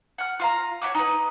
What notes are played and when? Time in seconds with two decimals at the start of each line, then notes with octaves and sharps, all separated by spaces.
0.18 F#5 F6
0.40 F4 F5 A#5
0.82 C#5 E5 F#5 D6
0.95 D#4 B4